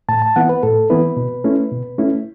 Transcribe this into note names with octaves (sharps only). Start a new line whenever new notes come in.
A2 A5
A5
E3 B3 E4 F#5
B4
A2 A4
E3 B3 E4 B4
B2
A3 C#4 E4
B2
A3 C#4 E4